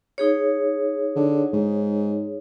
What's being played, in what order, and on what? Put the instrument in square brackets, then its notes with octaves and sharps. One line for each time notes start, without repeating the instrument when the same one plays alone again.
[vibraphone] D#4 G#4 C#5
[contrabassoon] D3
G#2